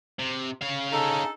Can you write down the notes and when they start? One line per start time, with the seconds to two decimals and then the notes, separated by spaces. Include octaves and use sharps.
0.19 C3
0.62 C#4 F5
0.92 D#4 G#4 A4